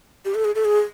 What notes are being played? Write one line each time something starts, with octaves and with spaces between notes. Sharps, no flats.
G4
A4
G#4
A4
G#4